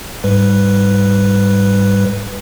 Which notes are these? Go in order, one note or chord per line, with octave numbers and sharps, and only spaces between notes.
G#2 G3 B4